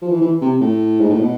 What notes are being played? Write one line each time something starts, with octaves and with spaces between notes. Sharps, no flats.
F3
E3
E3
C3
A2
G#2
A2
B2